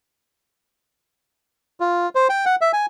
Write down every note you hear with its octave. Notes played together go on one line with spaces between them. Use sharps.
F4
C5
G5
F#5
E5
G#5